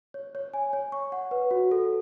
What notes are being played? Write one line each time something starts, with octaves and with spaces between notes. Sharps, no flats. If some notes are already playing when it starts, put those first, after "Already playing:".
C#5
C#5
G#5
C#5
C#6
F#5
B4
F#4
A4